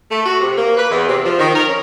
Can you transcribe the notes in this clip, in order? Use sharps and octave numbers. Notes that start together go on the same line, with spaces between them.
A3
F#4
C3
A#3
B4
E2
C3
F3
D#3
A#4
C#4